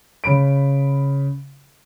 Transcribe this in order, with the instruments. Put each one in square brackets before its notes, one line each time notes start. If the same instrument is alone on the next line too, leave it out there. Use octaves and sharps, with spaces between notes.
[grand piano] C#3 B5 D7